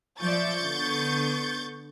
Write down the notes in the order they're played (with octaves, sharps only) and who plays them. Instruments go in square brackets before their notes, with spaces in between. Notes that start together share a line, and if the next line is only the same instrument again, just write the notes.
[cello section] F3 D5 E5 [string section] C#6 G6 A6
[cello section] D3 B3